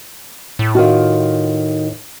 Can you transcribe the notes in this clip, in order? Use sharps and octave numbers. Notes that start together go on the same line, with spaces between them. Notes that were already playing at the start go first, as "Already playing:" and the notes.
A2
D#3 F4 F#4